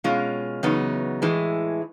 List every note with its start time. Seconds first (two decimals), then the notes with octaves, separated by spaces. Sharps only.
0.04 B2 G#3 C#4 F4
0.63 E2 C#3 F#3 B3 D#4
1.22 A2 E3 G#3